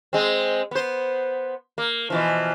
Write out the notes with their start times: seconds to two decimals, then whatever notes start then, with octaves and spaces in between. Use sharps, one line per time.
0.13 G#3 C4
0.71 B3 C5
1.78 A#3
2.10 B2 E3 F3